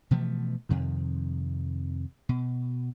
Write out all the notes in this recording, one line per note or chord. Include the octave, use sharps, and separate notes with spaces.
B2 E3 F3 A3
F2 C3 D#3
B2